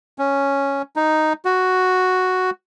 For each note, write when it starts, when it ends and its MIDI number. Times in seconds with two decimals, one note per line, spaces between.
0.18 0.82 61
0.96 1.33 63
1.45 2.50 66